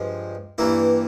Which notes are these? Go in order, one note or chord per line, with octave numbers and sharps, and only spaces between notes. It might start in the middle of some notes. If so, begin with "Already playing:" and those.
Already playing: G2 F3 G#3
G2 E3 A#3 E4